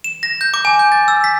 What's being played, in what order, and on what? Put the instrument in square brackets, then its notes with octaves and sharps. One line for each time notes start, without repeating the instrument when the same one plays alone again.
[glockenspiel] E7
A#6
G6
D6
G#5
G6
A6
E6
B6